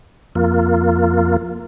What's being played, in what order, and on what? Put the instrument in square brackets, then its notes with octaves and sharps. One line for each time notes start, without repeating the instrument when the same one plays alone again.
[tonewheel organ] F2 A#3 F4